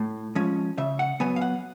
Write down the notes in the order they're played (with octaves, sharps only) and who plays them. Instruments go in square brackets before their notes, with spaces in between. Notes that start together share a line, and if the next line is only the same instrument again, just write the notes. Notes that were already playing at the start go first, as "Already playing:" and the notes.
Already playing: [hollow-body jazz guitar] A2
F3 G#3 C#4
C#3 E5
F#5
F#3 B3 G#5
F5
F#5